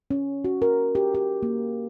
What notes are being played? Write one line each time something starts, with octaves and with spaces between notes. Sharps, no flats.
C#4
F#4
A#4
G4
G4
A#3